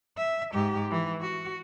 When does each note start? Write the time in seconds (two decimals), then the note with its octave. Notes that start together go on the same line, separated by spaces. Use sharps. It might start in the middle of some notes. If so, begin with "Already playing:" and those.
0.18 E5
0.53 G#2 G4
0.91 E3
1.21 F#4